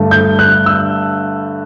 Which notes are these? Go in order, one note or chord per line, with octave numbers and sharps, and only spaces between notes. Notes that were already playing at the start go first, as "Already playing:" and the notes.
Already playing: G2 D3 A3
G6
F#6
E6